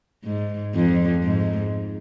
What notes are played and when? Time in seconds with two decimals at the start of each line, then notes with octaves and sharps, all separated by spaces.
0.24 G#2
0.75 F2
1.23 G#2